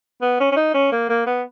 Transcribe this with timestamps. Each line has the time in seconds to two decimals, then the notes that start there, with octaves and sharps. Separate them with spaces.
0.22 B3
0.40 C#4
0.51 C#4
0.56 D#4
0.74 C#4
0.92 A#3
1.09 A#3
1.27 B3